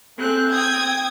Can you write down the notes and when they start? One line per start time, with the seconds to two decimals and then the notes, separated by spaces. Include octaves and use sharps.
0.18 A3 C4 G#4 F#6
0.51 G5 D#6 G#6